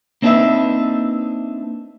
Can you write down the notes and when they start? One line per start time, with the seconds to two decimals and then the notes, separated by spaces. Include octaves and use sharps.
0.22 A#3 C4 D4 D#4 B4 E5